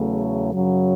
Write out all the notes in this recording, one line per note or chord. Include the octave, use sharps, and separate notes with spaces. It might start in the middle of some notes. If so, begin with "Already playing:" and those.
Already playing: E2 C#3 F#3 A3
F#2 C#3 F#3